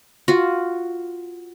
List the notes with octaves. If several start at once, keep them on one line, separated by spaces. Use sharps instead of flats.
F4 F#4